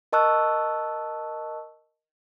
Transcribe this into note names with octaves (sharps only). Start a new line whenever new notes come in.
A#4 D#5 A5 C#6 E6 F#6